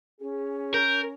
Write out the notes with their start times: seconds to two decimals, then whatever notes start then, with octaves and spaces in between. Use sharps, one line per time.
0.21 C#4 G#4
0.74 A#4 G6